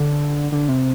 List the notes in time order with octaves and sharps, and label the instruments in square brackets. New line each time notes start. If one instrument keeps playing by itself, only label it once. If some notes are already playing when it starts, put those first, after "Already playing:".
Already playing: [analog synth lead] D3
D3
C3